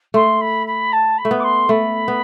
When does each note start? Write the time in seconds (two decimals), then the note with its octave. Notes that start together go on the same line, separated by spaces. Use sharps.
0.14 A3 C6
0.41 B5
0.67 B5
0.92 A5
1.18 B5
1.25 A3
1.31 B3
1.39 D6
1.43 C6
1.69 A3 B5
2.08 B3